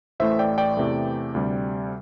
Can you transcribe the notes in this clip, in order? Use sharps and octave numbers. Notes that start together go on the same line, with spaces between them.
A1 A2 E3 A3 C5 E5
D5 G5
D5 G5
E2 C3 E3 A3
D2 C3 G3